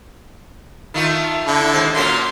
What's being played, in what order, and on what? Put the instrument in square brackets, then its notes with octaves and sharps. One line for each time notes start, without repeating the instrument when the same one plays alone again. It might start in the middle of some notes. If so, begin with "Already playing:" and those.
[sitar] D#3 A3 F4
[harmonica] D3 E4 A4
[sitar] D#2 G#3 C4
[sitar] A#2 C#4 F#4 [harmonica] A#3 C6